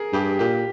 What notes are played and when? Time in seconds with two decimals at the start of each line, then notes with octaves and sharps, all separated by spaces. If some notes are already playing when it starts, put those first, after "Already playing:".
Already playing: G#4 A#4
0.13 G2 G4
0.39 A#2 G4